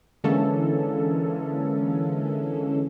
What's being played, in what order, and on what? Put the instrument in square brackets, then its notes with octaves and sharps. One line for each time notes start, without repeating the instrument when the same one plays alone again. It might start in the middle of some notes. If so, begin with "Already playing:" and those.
[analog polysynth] D3 E3 G#3 A#3 C#4 A4